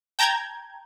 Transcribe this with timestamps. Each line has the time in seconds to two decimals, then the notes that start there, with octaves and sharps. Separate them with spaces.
0.19 G5 A5 A#5 G6 G#6